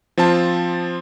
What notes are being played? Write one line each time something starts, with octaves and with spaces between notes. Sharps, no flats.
F3 C4 F4 A5